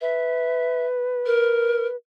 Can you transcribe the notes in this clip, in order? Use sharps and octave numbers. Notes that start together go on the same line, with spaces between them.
B4 E5
A#4